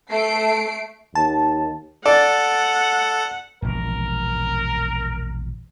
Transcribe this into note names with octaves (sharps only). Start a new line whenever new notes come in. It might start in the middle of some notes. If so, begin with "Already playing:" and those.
A3 C7 D7
D#2 A5
A4 D5 F#5
E1 A#1 A#4